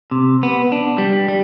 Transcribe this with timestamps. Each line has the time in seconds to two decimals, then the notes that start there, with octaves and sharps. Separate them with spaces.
0.11 C3
0.43 B3
0.72 D4
0.98 G3
1.28 G3